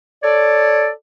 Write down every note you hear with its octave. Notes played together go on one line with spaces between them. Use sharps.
A4 C#5 D5